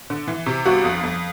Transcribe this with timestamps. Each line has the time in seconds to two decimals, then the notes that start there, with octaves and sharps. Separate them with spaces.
0.10 D3
0.28 E3
0.46 C3
0.65 G1 F#4
0.84 F2
1.03 F2